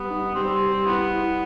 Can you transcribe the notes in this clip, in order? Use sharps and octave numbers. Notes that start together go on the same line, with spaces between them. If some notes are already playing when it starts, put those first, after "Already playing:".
Already playing: G3 B3
D#4
G3 C4
G3
B3 E4
E4